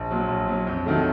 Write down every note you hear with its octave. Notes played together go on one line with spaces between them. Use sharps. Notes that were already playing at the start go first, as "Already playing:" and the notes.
Already playing: A#1
A#2 F#3
A#1
A#2 F#3
F2
C3 D#3 F#3 A3